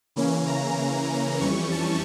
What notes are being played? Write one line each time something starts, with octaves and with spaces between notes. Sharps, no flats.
C#3 E3 A#3 C#4
A#5
F2 E3 G3 C#4 C#6
A5